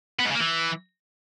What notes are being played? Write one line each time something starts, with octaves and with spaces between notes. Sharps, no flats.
B3
G#2
C#3
A#3
E3